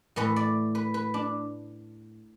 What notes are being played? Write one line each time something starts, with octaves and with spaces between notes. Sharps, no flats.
A2 E3 A3 B4
D5
B4
B4
D4